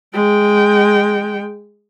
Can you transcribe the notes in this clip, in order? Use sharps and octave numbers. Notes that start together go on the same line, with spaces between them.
G#3 G5